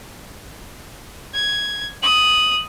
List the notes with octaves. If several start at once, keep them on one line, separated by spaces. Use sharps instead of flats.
G#6
D#6 F#7